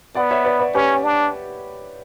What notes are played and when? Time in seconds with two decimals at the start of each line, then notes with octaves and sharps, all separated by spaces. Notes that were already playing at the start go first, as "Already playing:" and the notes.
0.15 B3 D5 F#5
0.31 C#5 E5
0.45 B4 D5
0.59 B4 D5
0.74 C#4 G4 B4
1.04 D4